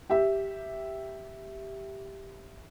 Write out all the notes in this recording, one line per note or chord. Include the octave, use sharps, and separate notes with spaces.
G4 E5